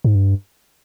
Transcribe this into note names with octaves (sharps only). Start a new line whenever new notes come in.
G#2
G2